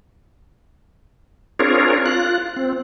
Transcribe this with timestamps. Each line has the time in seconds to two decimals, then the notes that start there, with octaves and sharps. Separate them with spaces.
1.59 C4 D4 F4 G#4 A#4 C#5
2.06 F4 F#6
2.57 C4